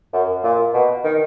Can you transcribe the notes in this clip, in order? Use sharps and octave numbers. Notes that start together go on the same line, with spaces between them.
F#2
A#2
B2
D#3